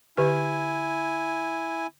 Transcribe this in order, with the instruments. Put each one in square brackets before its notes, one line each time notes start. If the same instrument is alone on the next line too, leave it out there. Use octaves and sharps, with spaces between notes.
[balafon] D3 G4 [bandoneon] E4 G#5